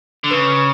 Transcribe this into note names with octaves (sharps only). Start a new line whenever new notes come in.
D3
C#3 B4